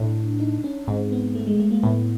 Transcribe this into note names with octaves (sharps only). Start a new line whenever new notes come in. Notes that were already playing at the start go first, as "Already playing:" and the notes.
Already playing: A2 D4
D#4
C#4
G#2 C4
B3
A3
G#3
A3
A#3
A2 B3